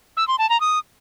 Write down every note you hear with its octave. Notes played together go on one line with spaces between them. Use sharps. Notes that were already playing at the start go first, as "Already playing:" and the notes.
E6
C6
A5
A#5
D#6